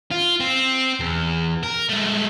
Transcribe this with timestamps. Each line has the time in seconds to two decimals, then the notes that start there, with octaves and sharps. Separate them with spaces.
0.11 F4
0.40 C4
1.00 E2
1.64 A#4
1.89 G#3 A3